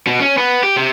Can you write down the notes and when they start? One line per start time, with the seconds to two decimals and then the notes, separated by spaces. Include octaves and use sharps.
0.07 B2
0.20 C#4
0.38 B3
0.63 G4
0.76 C3